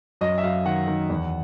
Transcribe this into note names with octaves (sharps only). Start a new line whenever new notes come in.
F#2 D#5
E5
F#2 F5
D#3 F#5
D#3
E2